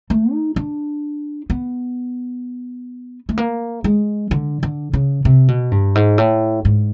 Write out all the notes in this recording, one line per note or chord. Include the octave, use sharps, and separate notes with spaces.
A3
D#4
D4
B3
A3
A#3
G#3
D3
D3
C#3
C3
B2
G2
G#2
A2
G#2